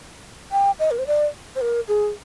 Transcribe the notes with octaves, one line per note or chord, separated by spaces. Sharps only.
G5
D#5
A#4
C5
D5
C5
A#4
G#4